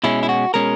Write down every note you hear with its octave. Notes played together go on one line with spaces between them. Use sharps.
B2 G#3 C#4 E4
E4
F#4
B2 G#3 C#4 A#4